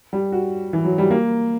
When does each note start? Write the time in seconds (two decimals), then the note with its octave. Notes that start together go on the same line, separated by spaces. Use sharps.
0.13 G3
0.32 F#4
0.73 E3
0.85 F#3
0.98 G3
1.10 A#3